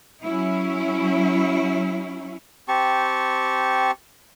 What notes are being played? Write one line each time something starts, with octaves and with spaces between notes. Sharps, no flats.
F#3 C#4 E4
C4 G4 A5 C#6